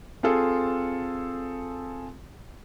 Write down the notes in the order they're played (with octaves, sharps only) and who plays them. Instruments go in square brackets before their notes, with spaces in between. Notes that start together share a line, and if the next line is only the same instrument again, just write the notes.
[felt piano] C4 F4 G#4 A4